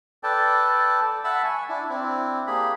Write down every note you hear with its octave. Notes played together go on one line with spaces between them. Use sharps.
A4 B4 D5 G5 A5
E5 F#5 A5 B5 E6
G#5 C#6
D4 E4
C4 D4 E4
A#3 G4 G#4 B5